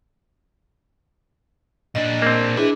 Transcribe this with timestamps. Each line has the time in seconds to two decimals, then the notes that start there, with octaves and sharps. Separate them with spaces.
1.95 A#2 D4 D#5
2.22 A#3 C4
2.57 D4 E4 G#4 B4 E5